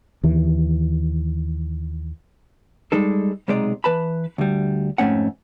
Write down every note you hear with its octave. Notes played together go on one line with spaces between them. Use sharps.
D#2 E3
G3 G#3 D#4 A4
B1 C3 G#3 D#4 D5
E3 B4 A5 B5
D2 G3
F2 G#2 A3 C4 C#4 F#5